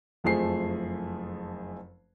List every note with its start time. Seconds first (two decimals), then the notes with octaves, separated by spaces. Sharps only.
0.24 F#1 F2 F3 A3 G#4 C7